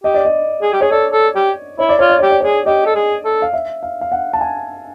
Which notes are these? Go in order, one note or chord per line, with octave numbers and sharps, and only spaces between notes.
G4 D#5
D5
D#5
G#4
G4
G#4 C#5
A4 D5
A4
G4
E4 C#5
D5
F4 C#5
D5
G4 C#5
D5
G#4 C#5
G4 D#5
A4
G#4
A4
F5
E5
F5
F5
F#5
A5
G#5